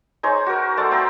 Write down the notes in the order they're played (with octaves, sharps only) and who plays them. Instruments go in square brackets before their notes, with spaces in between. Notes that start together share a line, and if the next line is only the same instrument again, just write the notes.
[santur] D#4 G#4 C5 C#5
F#4 A#4
A3 C5 D5 A5
E5 G5 A#5 C6